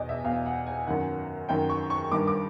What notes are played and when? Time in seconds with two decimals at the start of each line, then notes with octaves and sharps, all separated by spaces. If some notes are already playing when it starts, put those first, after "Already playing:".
Already playing: E2 B2 D5 D#5
0.09 E5
0.24 E2 B2 F5
0.46 F#5
0.66 G#5
0.87 F#2 D#3 F#5
1.49 F#2 D#3 G5
1.69 C#6
1.90 C#6
2.11 G2 D#3 D6
2.27 D6